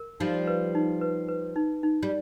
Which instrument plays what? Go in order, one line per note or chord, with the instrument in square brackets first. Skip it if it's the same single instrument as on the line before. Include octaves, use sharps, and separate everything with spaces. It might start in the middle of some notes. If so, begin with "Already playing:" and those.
Already playing: [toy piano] A#4
[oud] F3 G3 [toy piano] D#4
[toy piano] B4
D#4
B4
B4
D#4
D#4
[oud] G3